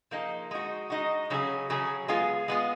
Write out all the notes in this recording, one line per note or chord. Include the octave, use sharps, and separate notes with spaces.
F3 A#3 D#4 G#4
G#3 D#4 F#4
G#3 D#4 F#4
C#3 F#3 C#4 G#4
C#3 F#3 C#4 G#4
G#3 B3 F4 G#4
G#3 B3 F4 G#4